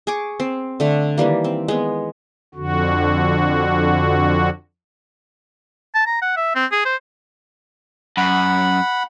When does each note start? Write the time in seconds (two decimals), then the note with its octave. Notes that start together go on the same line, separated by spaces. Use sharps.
0.07 G#4 G#5 C#6 D6
0.40 C4
0.80 D3 A3
1.18 D#3 E3 G3 A#3
1.44 C4
1.68 G#3 B3
2.55 F2 D3 F#4
5.94 A5
6.06 A#5
6.22 F#5
6.37 E5
6.55 C4
6.72 G#4
6.85 C5
8.17 F#2 F#5 B5